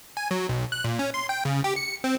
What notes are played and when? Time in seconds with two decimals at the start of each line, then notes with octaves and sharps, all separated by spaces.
0.17 G#5
0.31 F#3
0.49 B1
0.72 F#6
0.84 A#2
0.99 C#4
1.14 C6
1.29 G5
1.45 C#3
1.64 G4
1.76 C#7
2.04 C4